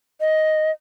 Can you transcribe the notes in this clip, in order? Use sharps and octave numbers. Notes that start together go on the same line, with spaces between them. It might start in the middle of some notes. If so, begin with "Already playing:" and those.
D#5